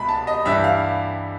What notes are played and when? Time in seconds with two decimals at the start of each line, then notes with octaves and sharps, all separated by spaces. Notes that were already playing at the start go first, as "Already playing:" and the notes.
Already playing: C2 B2 G#3 B5
0.08 A5
0.27 D#5
0.45 G2 E3 G3 E5
0.64 F5